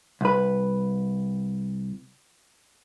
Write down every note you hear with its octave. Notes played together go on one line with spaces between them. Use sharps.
C2 B4